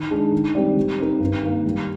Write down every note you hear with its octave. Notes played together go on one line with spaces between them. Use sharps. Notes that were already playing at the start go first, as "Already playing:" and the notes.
Already playing: D#3
G#3 D4 G#4
D#3
G3 C4 G4 D5
G3
C4 D#4 A#4
G2
D#3 A#3
G3